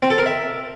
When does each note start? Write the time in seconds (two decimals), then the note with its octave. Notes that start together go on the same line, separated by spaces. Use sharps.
0.02 C4
0.10 A4
0.18 A#4
0.26 E5